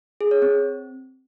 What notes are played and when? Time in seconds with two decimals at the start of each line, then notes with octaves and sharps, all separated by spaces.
0.21 G#4
0.31 C#5
0.42 C4